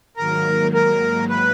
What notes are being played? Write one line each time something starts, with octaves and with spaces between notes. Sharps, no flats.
G#2 D#3 F#3 A#3 A#4
A#4
B4